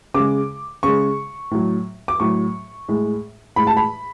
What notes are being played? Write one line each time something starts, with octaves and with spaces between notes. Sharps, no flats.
C#3 G#3 D6
C#3 G#3 C#6
A2 F#3
D6
A2 F#3 C#6
A2 G#3
A2 G#3 B5
A5
B5